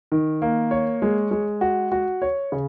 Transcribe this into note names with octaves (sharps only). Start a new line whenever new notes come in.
D#3
A#3
C#5
G#3
G#3
F#4
F#4
C#5
C#3